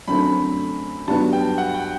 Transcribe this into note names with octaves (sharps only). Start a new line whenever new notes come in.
F#2 D3 A3 C4 B5
G2 F#3 B3 A5
G5
F#5
G5